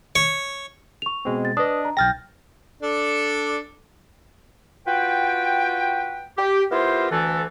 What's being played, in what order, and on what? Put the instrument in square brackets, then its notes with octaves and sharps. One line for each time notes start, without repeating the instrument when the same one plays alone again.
[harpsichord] C#5
[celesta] C#6 F7
[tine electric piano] B2 G#3 C4
[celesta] A6
[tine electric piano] D4 D#5 [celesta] B4 D#6
[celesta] A#5
[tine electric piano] B1 A6 A#6 [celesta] G5 F6 G6
[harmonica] D4 A4 D5
[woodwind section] F4 F#4 B4 G5
G4
B3 E4 F4 G4 A#4 C5
D2 E3 A4